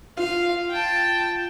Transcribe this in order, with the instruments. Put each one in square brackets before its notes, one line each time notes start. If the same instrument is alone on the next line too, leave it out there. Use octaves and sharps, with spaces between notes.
[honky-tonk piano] F4 [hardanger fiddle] F5
[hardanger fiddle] G5 A5